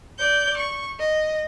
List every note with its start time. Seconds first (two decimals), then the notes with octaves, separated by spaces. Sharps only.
0.18 D5 G6
0.57 C#6
0.99 D#5